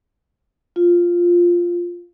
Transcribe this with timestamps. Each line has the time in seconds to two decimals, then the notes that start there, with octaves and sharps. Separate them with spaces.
0.76 F4